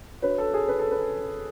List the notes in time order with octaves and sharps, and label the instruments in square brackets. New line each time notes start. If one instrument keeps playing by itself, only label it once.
[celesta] D4 F#4 C#5 [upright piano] B4
[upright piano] A4
G#4
B4
A4
B4